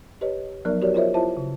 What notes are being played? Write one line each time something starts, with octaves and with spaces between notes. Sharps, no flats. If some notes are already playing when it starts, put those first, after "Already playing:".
G4 B4 C#5 D#5
F3 F#3 B3 D#4 A#4 D5
F#4 G4 A#4 C#5 D5
F4 A#4 C5 C#5 D#5 E5
E4 F4 C5 E5 A5
C#3